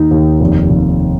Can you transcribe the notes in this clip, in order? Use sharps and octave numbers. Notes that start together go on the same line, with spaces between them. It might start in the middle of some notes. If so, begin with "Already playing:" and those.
Already playing: D#2 D#3 D#4
D#2
F1
F1